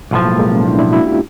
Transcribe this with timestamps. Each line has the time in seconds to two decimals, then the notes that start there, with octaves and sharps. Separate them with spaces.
0.11 B1 A2 F3
0.25 G#3 A#3
0.39 G#3 A#3
0.52 B3 C#4
0.65 D4 E4
0.79 D4 E4
0.92 E4 F#4
1.06 F4 G4